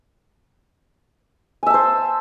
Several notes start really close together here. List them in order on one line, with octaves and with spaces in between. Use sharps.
G#5 E5 A5 C5